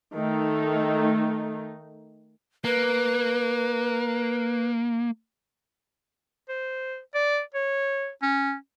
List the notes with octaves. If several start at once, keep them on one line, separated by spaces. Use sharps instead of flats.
D#3 A3 D#4
A#3 B4
C5
D5
C#5
C#4